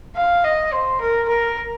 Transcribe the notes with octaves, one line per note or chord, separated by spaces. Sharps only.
F5
D#5
C5
A#4
A#4